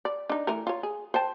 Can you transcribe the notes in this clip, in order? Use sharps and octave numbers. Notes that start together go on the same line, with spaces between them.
D5
D4 D#4
E3 A3 A#4
F4 C#5
G#4
C5 G5 A5